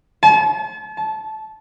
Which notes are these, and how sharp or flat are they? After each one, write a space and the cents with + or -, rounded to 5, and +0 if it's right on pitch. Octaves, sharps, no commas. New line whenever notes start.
A5 -40
A5 -15